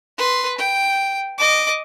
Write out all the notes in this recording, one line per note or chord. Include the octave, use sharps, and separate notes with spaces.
B4 C6
G5
D#5 D6